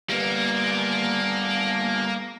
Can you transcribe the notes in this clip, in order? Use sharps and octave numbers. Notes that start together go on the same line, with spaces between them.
G3 A#3 B3